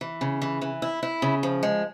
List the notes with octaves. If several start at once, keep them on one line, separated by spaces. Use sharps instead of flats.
E3
C#3
E3
E3
E4
E4
C#3
F3
G#3